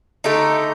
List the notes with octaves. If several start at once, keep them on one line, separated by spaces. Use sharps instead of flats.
D3 A3 D#4 G4